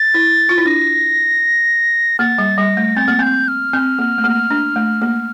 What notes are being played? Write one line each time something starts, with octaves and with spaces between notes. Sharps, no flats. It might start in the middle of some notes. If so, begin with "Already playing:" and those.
Already playing: A6
E4
F4
E4
D4 A#6
A#3 A6
G3
G3 A#6
A3
C4 A6
A#3
C4 G6
F6
C4
A#3
A3
A#3
D4
A3
A#3